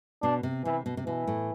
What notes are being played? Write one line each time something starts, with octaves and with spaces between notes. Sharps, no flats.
B2 D4
C3
C3 E3
B2
C3
B2 E3
A2